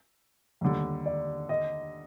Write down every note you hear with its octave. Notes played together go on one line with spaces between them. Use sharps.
D#2 D3 G3
D5
D#5